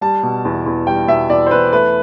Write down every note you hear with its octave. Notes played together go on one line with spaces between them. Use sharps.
G3 A5
B2
E2
E2
G3 G5
B2 E5
E2 D5
C5
E2 B4
A3 B4